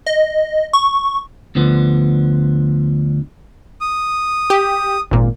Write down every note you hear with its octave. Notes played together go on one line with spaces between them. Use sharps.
D#5
C#6
D2 D3 F3 B3
D#6
G4
G#1 A#2